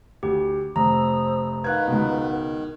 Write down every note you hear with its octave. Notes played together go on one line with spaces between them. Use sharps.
D2 G4
F1 C5 A#5 D#6 E6
D#3 B4 F5 F#5 F#6 G#6
C#2 B2